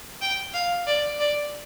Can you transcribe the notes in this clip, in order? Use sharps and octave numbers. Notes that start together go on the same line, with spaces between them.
G5
F5
D5
D5